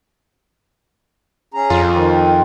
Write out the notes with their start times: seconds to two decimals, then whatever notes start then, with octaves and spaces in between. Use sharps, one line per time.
1.54 C#4 G#4 A#5
1.70 F2 F4
1.92 D#3 C4